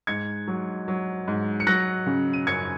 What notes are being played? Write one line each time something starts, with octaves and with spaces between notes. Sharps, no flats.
G#2 G#6 C#7
F#3
F#3
G#2
C#7
F#3 F#6 A#6
C#3
D#7
F#2 G#6 C#7